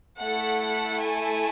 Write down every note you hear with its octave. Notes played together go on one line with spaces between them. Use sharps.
A3 E4 A4 F#5
G#5